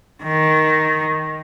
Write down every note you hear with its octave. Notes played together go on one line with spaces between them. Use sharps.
D#3